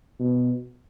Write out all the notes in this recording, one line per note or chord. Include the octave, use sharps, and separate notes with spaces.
B2